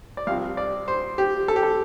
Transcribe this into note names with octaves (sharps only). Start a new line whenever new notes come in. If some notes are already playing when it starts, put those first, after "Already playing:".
D5
C2 C3 F3 F5
D5
C5
G4
A4
G4
A4